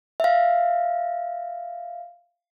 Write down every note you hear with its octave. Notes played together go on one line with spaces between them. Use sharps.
E5 F5